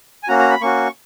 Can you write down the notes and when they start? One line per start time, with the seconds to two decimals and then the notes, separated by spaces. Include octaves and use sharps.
0.23 G#5
0.28 A#3 C#4 F#4 A#5
0.39 A#5
0.50 B5
0.61 A#3 C#4 F#4 C#6